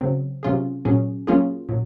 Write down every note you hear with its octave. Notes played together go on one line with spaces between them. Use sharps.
C#3 F#3 C4
C3 F#3 C#4 F4 G#4
A#2 F#3 C#4 G#4
F#3 A#3 C#4 F4 G#4
A#2 F#3